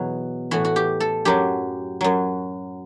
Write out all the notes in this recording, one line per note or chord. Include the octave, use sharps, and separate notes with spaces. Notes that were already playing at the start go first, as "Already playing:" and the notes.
Already playing: E2 B2 F#3
A2 E3 F#4
F#4
G4
A4
F#2 F#3 G4
F#2 F#3